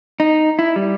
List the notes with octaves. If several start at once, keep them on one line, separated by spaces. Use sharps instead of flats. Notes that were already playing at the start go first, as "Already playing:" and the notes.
D#4
E4
G3